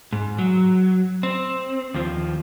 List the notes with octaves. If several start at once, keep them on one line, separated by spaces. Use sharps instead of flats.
G#2
F#3
C4
D#2 F3